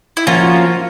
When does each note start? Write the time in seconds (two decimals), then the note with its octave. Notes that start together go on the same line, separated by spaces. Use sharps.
0.17 E4
0.27 F3 A#3 C#4 F4 F#4